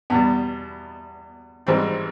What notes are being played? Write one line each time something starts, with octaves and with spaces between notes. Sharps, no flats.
E2 B2 G3
G#1 G#2 E3 G3 C4